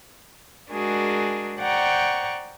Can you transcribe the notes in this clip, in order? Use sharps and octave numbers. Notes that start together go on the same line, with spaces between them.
G#3 D4 F#4 G#4 A#4
C5 D5 F#5 G5 A#5 C#6